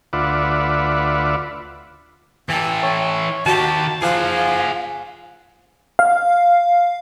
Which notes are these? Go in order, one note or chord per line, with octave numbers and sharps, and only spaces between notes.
D2 F4 B4 D5 E5 F#5
E3 A4 G5
C#5
D#3 F#4 G4 A5
F3 G#4 F5 F#5
F5